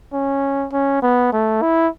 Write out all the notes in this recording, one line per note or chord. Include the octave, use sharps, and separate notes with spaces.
C#4
C#4
B3
A3
E4